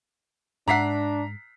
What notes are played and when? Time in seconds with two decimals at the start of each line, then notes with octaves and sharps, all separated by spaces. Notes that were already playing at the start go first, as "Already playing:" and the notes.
0.68 G#2 D4 D5 E5 F#5 A#5 B6 C7